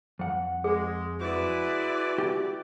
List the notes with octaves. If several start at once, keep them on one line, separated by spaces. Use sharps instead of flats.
F2 F#5
G#3 G#4
G#3 E4 F#4 B4 D5
G4